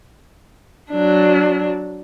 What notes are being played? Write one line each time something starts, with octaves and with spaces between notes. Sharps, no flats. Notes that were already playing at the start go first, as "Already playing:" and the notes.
F#3 D4